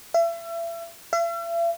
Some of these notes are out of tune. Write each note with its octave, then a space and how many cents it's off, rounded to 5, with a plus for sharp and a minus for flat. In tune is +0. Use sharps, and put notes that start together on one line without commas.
E5 +35
E5 +45